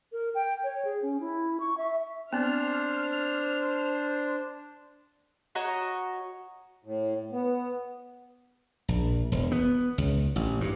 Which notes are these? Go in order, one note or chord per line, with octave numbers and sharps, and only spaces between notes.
A#4
G5
C#5
G#4
C#4
E4
C#6
E5
B3 C4 D4 C5 F6
F#4 C#5 D#5 A#5
A2
B3
A#1
E1
B3
C#2
A1
G2